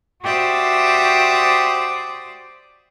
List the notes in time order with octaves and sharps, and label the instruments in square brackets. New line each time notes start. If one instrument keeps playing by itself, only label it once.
[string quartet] F#4 G4 C5 D5 E5 D#6